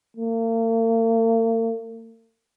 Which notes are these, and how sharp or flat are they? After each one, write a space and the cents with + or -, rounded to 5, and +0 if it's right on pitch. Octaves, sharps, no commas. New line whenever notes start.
A#3 -45